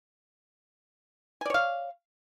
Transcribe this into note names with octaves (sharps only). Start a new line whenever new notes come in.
C#5 D5 F5 G#5